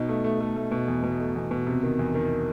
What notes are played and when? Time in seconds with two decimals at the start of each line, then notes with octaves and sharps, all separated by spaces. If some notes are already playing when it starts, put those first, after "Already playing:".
Already playing: B2 D#4
0.09 A3
0.24 A3
0.40 A3
0.56 A3
0.72 B2
0.88 E2
1.03 B2
1.20 A3
1.36 E2
1.51 B2
1.67 C3
1.83 D#3
1.99 E2
2.15 D#3